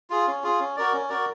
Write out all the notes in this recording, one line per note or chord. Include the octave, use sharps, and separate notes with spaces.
F4 G#4
C#4
F4 G#4
C#4
F#4 A#4 D5
C#4
F#4 A#4 D5